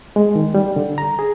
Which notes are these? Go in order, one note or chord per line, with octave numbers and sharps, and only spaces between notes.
G#3
D#3
G3
D3
A#5
G#4